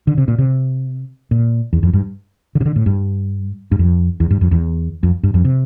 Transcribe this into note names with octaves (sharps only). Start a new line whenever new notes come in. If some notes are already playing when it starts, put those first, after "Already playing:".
D3
C3
A#2
C3
A#2
E2
F2
G2
D3
C3
D3
A2
G2
G2
F2
E2
G2
F2
E2
F2
G2
F2
C3